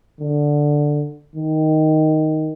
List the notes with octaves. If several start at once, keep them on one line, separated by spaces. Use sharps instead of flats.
D3
D#3